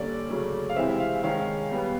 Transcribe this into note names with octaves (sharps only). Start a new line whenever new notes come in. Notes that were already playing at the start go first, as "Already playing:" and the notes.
Already playing: D3 G3 A#3 C#4 D5
C#3 F#3 A3 C#4
F5
C3 E3 G#3 C4 E5
F5
D#3 G#3 C#4 F5
B2 G3 B3